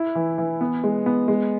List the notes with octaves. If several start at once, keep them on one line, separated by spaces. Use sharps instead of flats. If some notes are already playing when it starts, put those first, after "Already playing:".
Already playing: E4
E3
E3
B3
G#3
B3
G#3